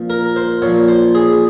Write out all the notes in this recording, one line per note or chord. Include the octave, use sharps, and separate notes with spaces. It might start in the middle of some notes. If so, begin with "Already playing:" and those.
Already playing: A#2 F3
A#4
C5
A#2 F3 C#5
C5
G#4